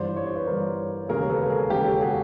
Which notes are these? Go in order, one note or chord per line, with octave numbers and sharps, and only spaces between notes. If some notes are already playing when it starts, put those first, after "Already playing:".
Already playing: G1 G2 E3 C5 D5
C#5
C5
B4 C#5
G1 G2 E3 A#4 C5
E1 D#2 C#3 G#4 A#4
A4 B4
G#4 A#4
E1 D#2 C#3 G4 A4
F#4 G#4